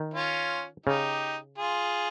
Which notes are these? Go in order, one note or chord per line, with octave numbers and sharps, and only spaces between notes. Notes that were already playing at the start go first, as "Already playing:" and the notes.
Already playing: D#3
C#4 F4
C#3 D#4 G4
F4 G#4